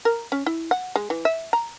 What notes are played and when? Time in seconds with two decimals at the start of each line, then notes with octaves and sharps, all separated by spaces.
0.05 A#4
0.32 C#4
0.46 E4
0.71 F#5
0.96 G#3
1.10 E3
1.25 E5
1.53 A#5